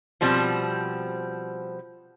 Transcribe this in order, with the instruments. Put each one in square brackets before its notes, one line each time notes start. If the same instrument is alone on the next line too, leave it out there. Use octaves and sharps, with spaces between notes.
[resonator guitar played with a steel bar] B2 F3 G3 C4